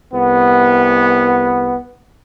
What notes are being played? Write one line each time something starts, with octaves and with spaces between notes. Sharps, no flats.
C2 B3